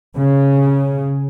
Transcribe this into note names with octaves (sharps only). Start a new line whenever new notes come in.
C#3